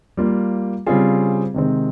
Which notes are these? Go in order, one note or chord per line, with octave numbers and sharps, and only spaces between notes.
G3 A#3 F4
C#3 G3 C4 F4 G#4
C3 D#3 G#3 C4